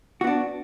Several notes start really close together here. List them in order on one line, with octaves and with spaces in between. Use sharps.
F#4 B3 D4